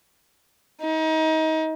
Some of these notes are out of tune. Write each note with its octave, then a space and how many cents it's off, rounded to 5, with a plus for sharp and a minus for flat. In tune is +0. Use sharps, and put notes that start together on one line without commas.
D#4 +30